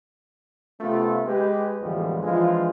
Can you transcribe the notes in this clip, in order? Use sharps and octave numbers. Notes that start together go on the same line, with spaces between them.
C3 A3 B3 C#4 F4
G#3 G4 B4
A1 E2 D3 F3 G3 G#3
E3 F3 G#3 D4 F4